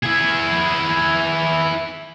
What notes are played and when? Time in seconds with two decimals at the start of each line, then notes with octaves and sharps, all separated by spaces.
0.03 E4 G#4